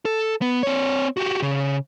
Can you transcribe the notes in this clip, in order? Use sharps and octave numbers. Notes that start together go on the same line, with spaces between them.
A4
B3
C4 C#5
F#4 G4
C#3